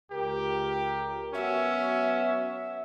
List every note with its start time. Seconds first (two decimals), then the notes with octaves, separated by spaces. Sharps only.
0.11 C#2 G4 A#4
1.34 F#3 B3 C#4 F#4 E5